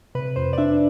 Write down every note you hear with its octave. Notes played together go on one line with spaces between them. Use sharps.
C3 B4
F2 C5
D5
D4 E5